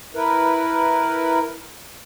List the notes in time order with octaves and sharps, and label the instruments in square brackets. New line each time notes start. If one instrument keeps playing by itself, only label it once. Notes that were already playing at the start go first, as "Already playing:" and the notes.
[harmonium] E4 A#4 B4